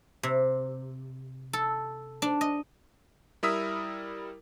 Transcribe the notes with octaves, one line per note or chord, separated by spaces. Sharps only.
C3
A4
D4
D#5
G3 E4 A#4 D#6 E6 B6